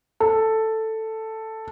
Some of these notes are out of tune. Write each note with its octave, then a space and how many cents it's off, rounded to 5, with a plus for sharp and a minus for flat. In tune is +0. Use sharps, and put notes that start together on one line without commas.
A4 +5